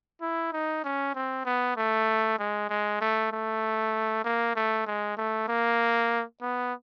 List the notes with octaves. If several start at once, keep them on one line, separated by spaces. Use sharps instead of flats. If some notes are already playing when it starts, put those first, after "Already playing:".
E4
D#4
C#4
C4
B3
A3
G#3
G#3
A3
A3
A#3
A3
G#3
A3
A#3
B3